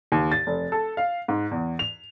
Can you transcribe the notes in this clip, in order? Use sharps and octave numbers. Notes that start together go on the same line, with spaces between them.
D#2
A6
F1
A4
F5
G#2
E2
F7